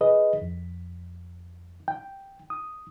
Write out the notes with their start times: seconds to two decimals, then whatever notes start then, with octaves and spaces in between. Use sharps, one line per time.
0.01 G#4 B4 D#5
0.42 F2
1.88 G5
2.50 D#6